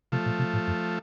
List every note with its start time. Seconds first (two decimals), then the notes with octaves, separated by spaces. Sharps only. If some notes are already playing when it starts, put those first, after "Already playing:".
0.12 C3 F3 A3
0.26 A#2
0.39 C3
0.53 A2
0.67 F#2